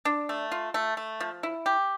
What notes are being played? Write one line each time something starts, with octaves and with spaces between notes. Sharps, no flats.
D4
A3
F4
A3
A3
F3
E4
G4